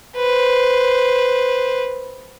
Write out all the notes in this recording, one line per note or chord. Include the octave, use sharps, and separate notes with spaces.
B4 C5